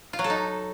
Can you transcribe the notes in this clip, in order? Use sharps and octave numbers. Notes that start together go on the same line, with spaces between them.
F4
F#3
A4
D#4